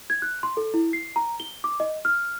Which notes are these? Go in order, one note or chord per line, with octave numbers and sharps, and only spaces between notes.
G#6
F#6
C6
A4
E4
C7
A#5
G7
D6
D#5
F6